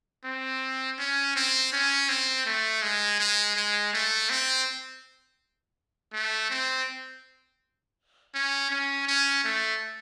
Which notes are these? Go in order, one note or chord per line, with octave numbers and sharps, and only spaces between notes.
C4
C#4
C4
C#4
C4
A3
G#3
G#3
G#3
A3
C4
A3
C4
C#4
C#4
C#4
A3